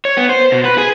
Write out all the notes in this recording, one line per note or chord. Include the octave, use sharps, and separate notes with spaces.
C#5
B3
C5
B2
B4
G#4